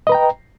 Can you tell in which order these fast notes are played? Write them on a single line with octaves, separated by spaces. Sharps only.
D#5 B4 A#5 G5